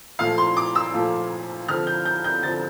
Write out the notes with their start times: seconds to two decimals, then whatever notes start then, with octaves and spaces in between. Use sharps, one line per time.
0.19 A#2 F3 A3 F5
0.38 C6
0.57 D6
0.75 E6
0.94 A#2 F3 A3
1.68 D3 F3 C4 F6
1.87 G6
2.05 G6
2.24 G6
2.43 D3 F3 C4 A6